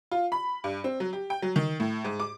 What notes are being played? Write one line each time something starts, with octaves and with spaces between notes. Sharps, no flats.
F4
B5
G2
C4
F#3
G4
G5
F#3
D#3
A2
G#2
D6